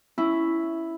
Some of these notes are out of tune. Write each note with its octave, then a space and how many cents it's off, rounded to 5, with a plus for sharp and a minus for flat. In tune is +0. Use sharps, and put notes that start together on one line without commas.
C#4 +0 E4 +0